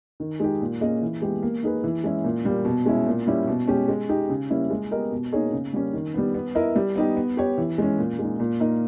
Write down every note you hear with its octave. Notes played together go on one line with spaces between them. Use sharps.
D#3
G#3 D#4 G4
A#2
A#3 C#4 G#4 D#5
E3
G#3 B3 G4
A#3
D#4 G#4 B4
E3
G#3 C#4 E4
A#2
G3 A#3
B2
G#3 C#4 E4
A#2
G3 C#4 E4
B2
G#3 C#4 G4
G#3
D#4 G4
C#3
G3 A#3 C#4 E4
G#3
B3 G4 A#4 D#5
B2
A#3 D#4 G#4 C#5
C#3
G3 A#3 C#4
D#3
G3 B3
B3
E4 A#4 D#5
G3
B3 D#4 G4
B3
G4 C#5
E3
G#3 C#4
A#2
G#3 D#4
A#2
A#3 D#4 A#4 D#5